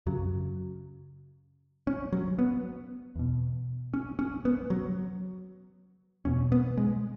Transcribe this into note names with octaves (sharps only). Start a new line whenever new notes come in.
F#2 C#3 F#3
C#4
F#3
B3
E2 B2
C#4
C#4
B3
F#3
E2 B2 C#4
B3
G#3